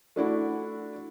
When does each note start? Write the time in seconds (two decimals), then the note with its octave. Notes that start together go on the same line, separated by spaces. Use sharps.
0.16 A3 D4 E4 F#4